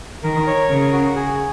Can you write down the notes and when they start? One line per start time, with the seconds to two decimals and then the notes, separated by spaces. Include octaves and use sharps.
0.23 D#3 A#4
0.47 C#5
0.70 C#3 A#4
0.92 F#4
1.16 G#4